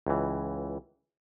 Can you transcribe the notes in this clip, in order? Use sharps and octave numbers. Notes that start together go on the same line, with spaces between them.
C#2 E3